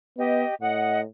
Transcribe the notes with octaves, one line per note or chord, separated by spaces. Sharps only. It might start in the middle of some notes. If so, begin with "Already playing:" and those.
B3 G4 D#5
A2 D#5 F#5